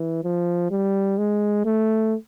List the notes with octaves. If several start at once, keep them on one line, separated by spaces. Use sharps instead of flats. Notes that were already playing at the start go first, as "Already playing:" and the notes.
Already playing: E3
F3
G3
G#3
A3